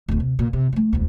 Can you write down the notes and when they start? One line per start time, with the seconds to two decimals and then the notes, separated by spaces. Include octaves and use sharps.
0.08 D1 D2
0.20 C3
0.39 A#2
0.53 C3
0.72 F#3 A3
0.93 E1 D2